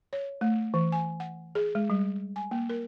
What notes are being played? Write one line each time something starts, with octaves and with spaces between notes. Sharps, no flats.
C#5
A3
E3
G#5
F#5
G#4
G#3
G3
G#5
A#3
A#4